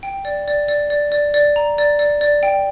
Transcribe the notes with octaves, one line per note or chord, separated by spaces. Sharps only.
G5
D5
D5
D5
D5
D5
D5
A#5
D5
D5
D5
G5